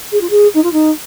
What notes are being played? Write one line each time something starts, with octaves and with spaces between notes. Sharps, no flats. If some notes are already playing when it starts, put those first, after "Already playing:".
G#4
F4
G#4
D#4
F4
D#4